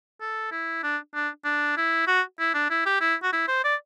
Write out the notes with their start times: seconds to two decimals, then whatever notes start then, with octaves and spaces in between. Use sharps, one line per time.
0.21 A4
0.51 E4
0.83 D4
1.15 D4
1.45 D4
1.77 E4
2.07 F#4
2.39 E4
2.54 D4
2.70 E4
2.86 G4
3.01 E4
3.23 F#4
3.33 E4
3.48 C5
3.64 D5